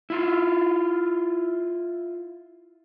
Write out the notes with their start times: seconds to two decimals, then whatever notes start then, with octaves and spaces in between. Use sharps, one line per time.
0.10 E4 F4